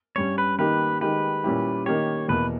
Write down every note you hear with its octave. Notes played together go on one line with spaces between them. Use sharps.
G2 G3 C#4 C#5
B4
D#3 A#3 D#4 G4 B4
D#3 G#3 D#4 G4 B4
A#2 G3 C#4 E4 G4
D#3 A#3 D#4 G4 C#5
E2 B2 A#3 B4